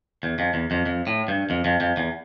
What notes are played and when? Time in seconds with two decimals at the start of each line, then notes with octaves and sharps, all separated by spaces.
0.23 E2
0.39 F2
0.54 E2
0.71 F2
0.86 F2
1.07 A2
1.28 G2
1.50 F2
1.65 F2
1.81 F2
1.97 E2